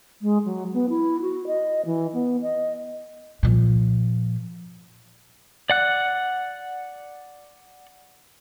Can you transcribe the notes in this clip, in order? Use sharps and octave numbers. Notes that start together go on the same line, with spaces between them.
G#3
F#3
B3
E4
F#4
D#5
E3
B3
D#5
A#2 F3
D5 F#5 F#6